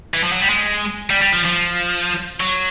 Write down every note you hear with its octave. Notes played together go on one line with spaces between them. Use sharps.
E3
F3
F#3
G3
G#3
G3
G3
F3
F3
F#3